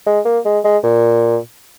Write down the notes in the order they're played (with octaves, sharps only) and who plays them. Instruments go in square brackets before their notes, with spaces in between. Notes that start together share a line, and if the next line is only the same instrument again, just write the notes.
[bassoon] G#3
A#3
G#3
G#3
A#2